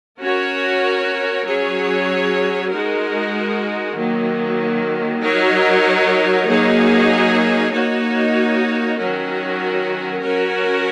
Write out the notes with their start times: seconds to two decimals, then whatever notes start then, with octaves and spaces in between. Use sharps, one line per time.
0.20 C#4 F#4 A#4 C#5
1.46 F#3 C#4 G#4 C#5
2.70 G#3 D#4 F#4 A#4
3.95 D#3 F#3 A#3
5.21 F#3 D#4 A#4 C#5
6.47 F#3 A#3 D#4 G#4 C#5
7.71 A#3 D#4 F#4 C#5
8.97 D#3 F#3 C#4 F#4 A#4
10.21 F#3 C#4 F#4 A#4 C#5